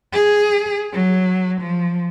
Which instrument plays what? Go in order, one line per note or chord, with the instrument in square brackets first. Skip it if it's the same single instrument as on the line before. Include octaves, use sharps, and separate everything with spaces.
[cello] G#4
F#3
F3